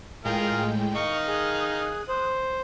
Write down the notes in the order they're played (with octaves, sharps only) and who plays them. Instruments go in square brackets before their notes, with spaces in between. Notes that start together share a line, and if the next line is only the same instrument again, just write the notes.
[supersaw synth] A2 G#3 G5 [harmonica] F4 G#4 A#4
[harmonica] D#3 D#4 F5 [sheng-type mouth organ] C#6
[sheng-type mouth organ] G#4 [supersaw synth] D#6 F#6
[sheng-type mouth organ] C5